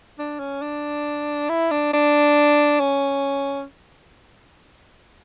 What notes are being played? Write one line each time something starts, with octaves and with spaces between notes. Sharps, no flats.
D4
C#4
D4
E4
D4
D4
C#4